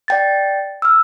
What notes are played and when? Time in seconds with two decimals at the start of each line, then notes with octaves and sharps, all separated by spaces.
0.08 D5 G5 A6
0.82 E6 F6